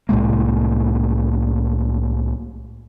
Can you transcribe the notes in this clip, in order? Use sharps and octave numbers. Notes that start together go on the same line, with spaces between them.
C2 A2 G#3 A#3